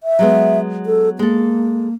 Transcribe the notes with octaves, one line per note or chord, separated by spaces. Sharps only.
E5
F#3 G#3 B3
A4
G#3 A#3 A4